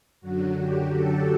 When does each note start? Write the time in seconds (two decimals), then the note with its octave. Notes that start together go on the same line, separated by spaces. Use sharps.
0.21 F#2 D3 F#3 F#4
0.58 G4
0.94 A4